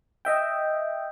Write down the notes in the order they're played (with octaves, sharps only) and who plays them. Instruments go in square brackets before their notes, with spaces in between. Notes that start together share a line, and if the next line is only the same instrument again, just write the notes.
[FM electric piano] D#5 E5 G5